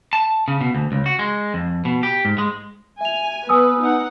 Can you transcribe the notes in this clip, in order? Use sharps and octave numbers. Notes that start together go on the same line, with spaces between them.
A5
C#3
B2
D2
C#2
F#4
G#3
F2
B2
G4
G#2
G#3
E5 G#5 F7
B3 B4 G#5 D#6 E6
B3 D#4 F#5